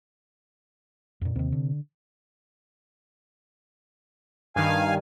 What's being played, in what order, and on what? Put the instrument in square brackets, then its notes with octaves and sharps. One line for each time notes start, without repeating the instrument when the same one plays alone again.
[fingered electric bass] F2 A#2
[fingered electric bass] D#2 D#3 [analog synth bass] C3
[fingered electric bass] D3
[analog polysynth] G2 D#3 [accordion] F5 G#5